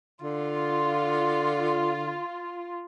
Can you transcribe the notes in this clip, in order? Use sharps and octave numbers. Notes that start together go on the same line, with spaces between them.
D3 F4